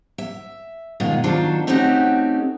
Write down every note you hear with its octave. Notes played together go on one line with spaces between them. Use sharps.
E5
G#2 B2 D#3 G#3 F4 G#4
D#3 F#3 D4 F4 A4 C5
A3 C4 C#4 D#4 F#4 G4